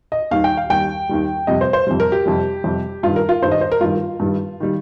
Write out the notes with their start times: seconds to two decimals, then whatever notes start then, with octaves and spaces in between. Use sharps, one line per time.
0.12 D#5
0.31 D#2 D#3 G3 F5
0.44 G5
0.57 F5
0.70 D#2 D#3 G3 G5
1.09 D#2 D#3 G3
1.47 F2 C3 G3 D#5
1.61 C5
1.73 C5
1.87 F2 C3 G3
2.00 A#4
2.12 G4
2.26 F2 C3 G3
2.64 F2 C3 G3
3.03 G2 D#3 G3 F4
3.16 A#4
3.29 F4
3.42 G2 D#3 G3 C5
3.51 D#5
3.61 C5
3.72 A#4
3.81 G2 D#3 G3 F4
4.20 G2 D#3 G3
4.60 D#3 G3